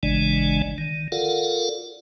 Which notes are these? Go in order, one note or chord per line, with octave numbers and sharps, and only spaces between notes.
G#1 C#3 E3 G#3 D4 D5
D#3
F4 A4 A#4 D5 F5 F#5